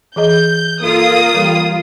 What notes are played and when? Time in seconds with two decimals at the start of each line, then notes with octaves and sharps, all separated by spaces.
0.16 E3 G#4 D#5 G6
0.82 A#3 F4 A4 D#6
1.34 E3 G3 A4 A#4